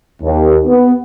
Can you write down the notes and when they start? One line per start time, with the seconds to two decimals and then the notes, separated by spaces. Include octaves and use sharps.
0.23 D#2
0.67 B3